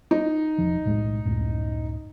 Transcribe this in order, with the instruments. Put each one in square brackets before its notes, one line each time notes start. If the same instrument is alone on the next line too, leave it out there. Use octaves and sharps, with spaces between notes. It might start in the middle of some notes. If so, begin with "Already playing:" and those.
[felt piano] D#4
[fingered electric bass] E1 F3
B1 A2 G#3
C#2 F#2 A2